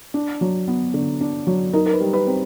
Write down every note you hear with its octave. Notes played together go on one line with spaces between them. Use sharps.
D4
F#3
B3
D3
D4
F#3
D#4 A#4
A#4
B4
G3
B4
C4